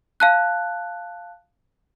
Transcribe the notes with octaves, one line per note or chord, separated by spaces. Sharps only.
F5 A5 F#6